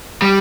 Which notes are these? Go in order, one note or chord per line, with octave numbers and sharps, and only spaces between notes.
G3